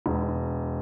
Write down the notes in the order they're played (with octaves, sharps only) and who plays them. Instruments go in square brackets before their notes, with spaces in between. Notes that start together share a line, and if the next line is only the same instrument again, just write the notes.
[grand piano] E1